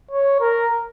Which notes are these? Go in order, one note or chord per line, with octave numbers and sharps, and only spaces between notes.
C#5
A#4